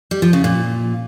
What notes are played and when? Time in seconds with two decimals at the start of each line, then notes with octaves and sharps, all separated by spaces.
0.11 G3
0.22 F3
0.33 C#3
0.44 A#2